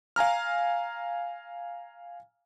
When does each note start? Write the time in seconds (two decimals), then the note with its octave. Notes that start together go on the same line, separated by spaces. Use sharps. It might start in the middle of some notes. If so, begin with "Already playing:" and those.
0.16 F5 G#5 A#5 F6